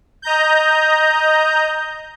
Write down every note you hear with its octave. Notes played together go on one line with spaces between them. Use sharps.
D#5 A#5 G6